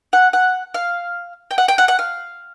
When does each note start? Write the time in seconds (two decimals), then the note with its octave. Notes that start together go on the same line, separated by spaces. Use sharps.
0.13 F#5
0.33 F#5
0.74 F5
1.51 G5
1.58 F#5
1.68 G5
1.78 F#5
1.88 F#5
1.99 F5